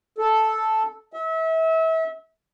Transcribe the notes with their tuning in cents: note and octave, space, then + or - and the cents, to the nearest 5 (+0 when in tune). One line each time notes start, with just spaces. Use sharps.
A4 -5
E5 -30